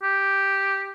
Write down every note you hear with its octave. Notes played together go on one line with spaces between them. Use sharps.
G4